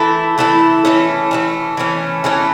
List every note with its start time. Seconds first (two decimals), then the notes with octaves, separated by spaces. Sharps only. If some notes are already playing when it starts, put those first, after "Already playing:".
Already playing: E3 A3 E4 A4
0.38 E3 A3 E4 A4
0.85 E3 A3 C#4
1.31 E3 A3 C#4
1.77 E3 A3 C#4
2.24 E3 A3 C#4